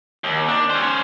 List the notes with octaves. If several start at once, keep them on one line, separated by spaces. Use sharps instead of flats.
D#2
D4
C#4 C5